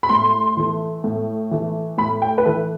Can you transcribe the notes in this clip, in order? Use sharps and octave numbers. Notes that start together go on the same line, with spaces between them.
B5
A2 C6
E3 A3
A2
E3 A3
A2 B5
G5
B4
E3 A3 A4